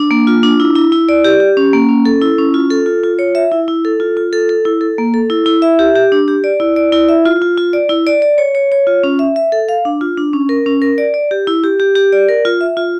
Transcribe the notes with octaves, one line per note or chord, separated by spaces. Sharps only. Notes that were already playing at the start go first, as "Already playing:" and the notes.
Already playing: D4
A#3
F4
D4
E4
E4
E4
D5
G4
G4
C#4
A#3
C#4
A4
E4
C#4
F4
A4
F4
F4
C#5
E5
E4
E4
A4
F4
F4
A4
A4
E4
A4
A#3
A4
E4
E4
E5
G4
G4
D4
G4
D5
E4
D5
E4
E5
F4
F4
F4
D5
E4
D5
D5
C#5
C#5
C#5
F4
C#4
E5
E5
A4
F5
D4
F4
D4
C#4
A#4
C#4
A#4
D5
D5
G4
E4
G4
G4
G4
D5
A#4
F4
E5
F4